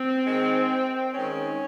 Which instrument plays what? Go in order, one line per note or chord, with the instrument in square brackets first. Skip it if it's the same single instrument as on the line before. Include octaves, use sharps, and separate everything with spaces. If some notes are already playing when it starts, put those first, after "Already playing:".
Already playing: [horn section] C4
D#3 G#3
D#3 G#3 C#4